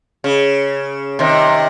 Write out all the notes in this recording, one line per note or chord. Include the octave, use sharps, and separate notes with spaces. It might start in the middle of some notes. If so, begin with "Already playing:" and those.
C#3
C3 D#3